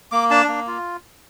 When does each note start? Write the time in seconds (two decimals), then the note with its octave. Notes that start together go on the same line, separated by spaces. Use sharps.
0.12 A#3 D6
0.31 D4 A5
0.48 A#3
0.67 F4